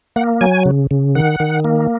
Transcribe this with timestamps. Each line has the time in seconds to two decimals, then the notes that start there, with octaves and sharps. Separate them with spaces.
0.16 A#3 F#5
0.41 F#3 G#5
0.66 C#3
0.91 C#3
1.15 D#3 F#5
1.40 D#3
1.64 A#3